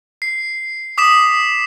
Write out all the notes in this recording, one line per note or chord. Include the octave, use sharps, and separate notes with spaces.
C7
D6 D#6 B6 E7